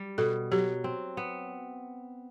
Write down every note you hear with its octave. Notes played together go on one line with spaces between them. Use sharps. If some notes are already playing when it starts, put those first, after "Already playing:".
Already playing: G3
B2 A4
F#3 G4
C4
B3